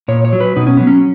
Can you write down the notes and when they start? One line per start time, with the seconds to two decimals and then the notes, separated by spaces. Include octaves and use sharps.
0.08 A#2 C#5
0.25 C#5
0.33 F#3
0.40 B4
0.56 B2 D#4
0.67 C#4
0.77 F#3 B3
0.87 C#4